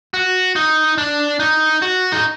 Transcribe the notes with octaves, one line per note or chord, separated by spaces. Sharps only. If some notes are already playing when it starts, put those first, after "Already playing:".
F#4
D#4
D4
D#4
F#4
D#4